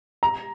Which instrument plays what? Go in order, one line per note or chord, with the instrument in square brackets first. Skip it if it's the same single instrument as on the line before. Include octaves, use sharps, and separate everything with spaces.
[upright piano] A#5